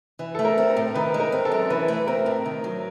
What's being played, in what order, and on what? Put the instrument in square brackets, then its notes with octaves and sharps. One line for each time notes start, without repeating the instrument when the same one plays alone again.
[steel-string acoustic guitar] E3
[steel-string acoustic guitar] A3 [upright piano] A4
[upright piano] A#4
[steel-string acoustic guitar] C4
[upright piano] A#4
[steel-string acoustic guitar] A2
[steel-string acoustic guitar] D#3 [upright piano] B4
[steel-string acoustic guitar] G#3
[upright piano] A#4
[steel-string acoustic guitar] C4
[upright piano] A4
[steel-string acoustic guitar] F#2
[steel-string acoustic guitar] E3 [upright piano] B4
[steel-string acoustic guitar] A3
[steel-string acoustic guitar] C4 [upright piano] A#4
[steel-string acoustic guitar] A2
D#3
F#3